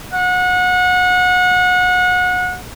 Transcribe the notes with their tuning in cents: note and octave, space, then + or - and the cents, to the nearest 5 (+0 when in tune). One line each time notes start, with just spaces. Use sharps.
F#5 -30